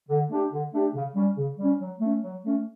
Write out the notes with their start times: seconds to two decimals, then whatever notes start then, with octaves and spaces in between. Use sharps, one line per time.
0.09 D3
0.30 A3 D4 G4
0.52 D3
0.73 A3 D4 G4
0.94 C#3
1.15 G3 C#4
1.36 C#3
1.58 G3 C#4
1.80 F#3
2.01 A3 C#4
2.23 F#3
2.44 A3 C#4